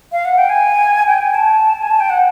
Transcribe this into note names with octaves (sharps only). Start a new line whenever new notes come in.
F5
F#5
G5
G#5
G5
G#5
A5
G#5
A5
G5
F#5